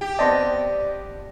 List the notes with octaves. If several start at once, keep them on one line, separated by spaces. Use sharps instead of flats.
G4
B3 C4 D5 D#5 A5 C6 A#6